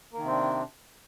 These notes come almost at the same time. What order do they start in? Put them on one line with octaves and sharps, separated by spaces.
A#3 D#3 C3 C4 D4